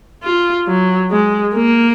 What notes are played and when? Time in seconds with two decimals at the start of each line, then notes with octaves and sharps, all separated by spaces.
0.23 F4
0.68 F#3
1.11 G#3
1.56 A#3